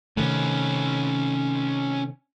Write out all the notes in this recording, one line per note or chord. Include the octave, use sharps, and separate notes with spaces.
C3 D#3 A3 C#4 B4